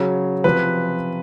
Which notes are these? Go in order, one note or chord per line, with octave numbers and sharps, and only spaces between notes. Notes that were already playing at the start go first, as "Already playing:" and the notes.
Already playing: C#3 F#3
C3 F3 B4